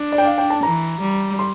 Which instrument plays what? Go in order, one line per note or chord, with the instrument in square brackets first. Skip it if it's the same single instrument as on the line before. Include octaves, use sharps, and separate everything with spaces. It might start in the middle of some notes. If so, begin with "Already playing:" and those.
Already playing: [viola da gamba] D4
[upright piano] D5
G5
F5
G5
A5
[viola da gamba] E3 [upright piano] A#5
[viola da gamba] G3
[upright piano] C6